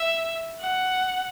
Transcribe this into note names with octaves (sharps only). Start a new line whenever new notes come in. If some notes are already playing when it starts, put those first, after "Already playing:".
Already playing: E5
F#5